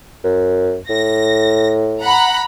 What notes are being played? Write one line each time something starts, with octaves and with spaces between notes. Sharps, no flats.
F#2
A2 A#6
F#5 A#5 B5